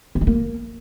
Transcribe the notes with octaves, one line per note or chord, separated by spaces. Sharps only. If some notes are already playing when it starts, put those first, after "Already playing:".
A#3
A3
A#3